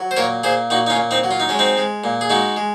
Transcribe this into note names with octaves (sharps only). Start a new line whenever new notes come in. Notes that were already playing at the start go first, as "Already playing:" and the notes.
Already playing: F#3
C5
A#2 A#4 C#5
A#2 G#4 C5
A#2 D#4 F#4
D#4
C#4 F4
A#2
C4 D#4
F#3
F4
D#4
G#3 C#4
C4 D#4
G#3
A#2
G#4
G#3 D#4 F#4
G#3